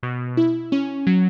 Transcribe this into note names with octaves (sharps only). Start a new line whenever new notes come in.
B2
E4
C#4
F#3